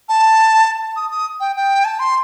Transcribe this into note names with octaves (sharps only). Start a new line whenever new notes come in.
A5
D#6
D#6
G5
G5
A5
C6